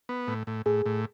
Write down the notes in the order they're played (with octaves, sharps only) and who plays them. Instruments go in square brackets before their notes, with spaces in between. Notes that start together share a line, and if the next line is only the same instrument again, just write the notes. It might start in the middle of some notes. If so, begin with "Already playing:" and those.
[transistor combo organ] B3
A2
A2
[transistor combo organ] A2 [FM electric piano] G#4
[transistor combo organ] A2